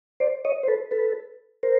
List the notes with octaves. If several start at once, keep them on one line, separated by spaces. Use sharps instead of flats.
C5 D5
C#5 D#5
C5
A4 B4
A4 B4
A#4 C5